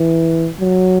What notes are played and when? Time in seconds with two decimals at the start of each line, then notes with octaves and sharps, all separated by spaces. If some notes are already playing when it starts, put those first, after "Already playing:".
Already playing: E3
0.60 F#3